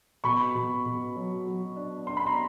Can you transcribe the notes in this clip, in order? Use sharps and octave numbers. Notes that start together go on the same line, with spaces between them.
B2 B5 C#6
B2
B2
F#3
F#3
D4
D4 C6
B5
A#5 C6